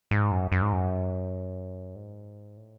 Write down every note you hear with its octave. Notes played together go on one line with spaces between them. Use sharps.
G#2
F#2
F#2
G#2
F#2
G#2
A2